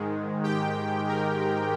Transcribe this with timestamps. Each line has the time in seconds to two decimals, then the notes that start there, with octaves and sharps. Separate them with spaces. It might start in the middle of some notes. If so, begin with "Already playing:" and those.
Already playing: G#2 D#3 G#3
0.44 G4 G5
1.09 A#4